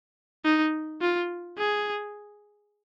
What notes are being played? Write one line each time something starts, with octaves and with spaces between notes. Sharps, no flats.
D#4
F4
G#4